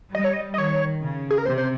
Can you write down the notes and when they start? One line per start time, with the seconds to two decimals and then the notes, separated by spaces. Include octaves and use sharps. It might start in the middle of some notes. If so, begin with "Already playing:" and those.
0.14 G3 D#5
0.24 C#5
0.33 D#5
0.54 D#5
0.58 D#3 C#5
1.02 C#3
1.31 G#4
1.38 A#4
1.46 C3 C5
1.58 C5